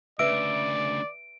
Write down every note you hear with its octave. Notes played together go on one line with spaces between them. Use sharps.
D2 C#3 B4 D5 E5 E6 D7